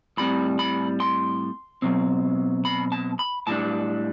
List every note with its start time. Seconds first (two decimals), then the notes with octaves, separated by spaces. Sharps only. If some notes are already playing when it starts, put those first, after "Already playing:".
0.17 A2 G3 C4 B5
0.59 B5
1.00 C6
1.82 B2 F#3 C4
2.65 B5
2.92 A5
3.19 B5
3.47 A2 G3 D4 A5